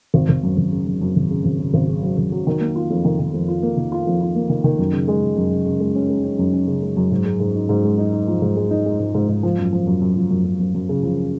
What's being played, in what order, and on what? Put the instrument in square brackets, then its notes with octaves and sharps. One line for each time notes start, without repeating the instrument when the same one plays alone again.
[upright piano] G#1
G#1
F#2
G#1
C#3
F#2
F#2
G#1
C#3
G#1
C#3
G#1
C#3
F#3
G#1
F#3
D#3
A#3
F4
F2
D#3
D#3
F2
F4
A#3
D#3
F4
F2
F4
A#3
D#3
D#3
F#2
C#3
G#3
C#3
F#2
C#3
C#3
G#3
C#4
G#3
C#4
F#2
C#4
C#3
G#3
F#2
G#2
G#3
G#2
D#4
G#2
G#3
D#4
D#4
F3
G#2
G#3
D#4
G#3
G#2
G#2
G#2
F3
F#2
F3
F#2
F#2
F3
F#2
F#2
F#2
F#2
C#3
F3